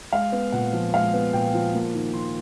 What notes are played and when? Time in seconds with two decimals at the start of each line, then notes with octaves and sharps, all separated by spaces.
0.13 G#3 F5
0.32 B3
0.52 A#2 F#5
0.73 F3
0.93 G#3 F5
1.14 B3
1.33 A#2 G5
1.54 F3
1.74 A#3
1.94 D#3
2.14 D#3 C6